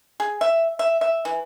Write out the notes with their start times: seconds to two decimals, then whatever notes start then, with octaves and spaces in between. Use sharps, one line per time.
0.20 G#4
0.41 E5
0.79 E5
1.01 E5
1.25 E3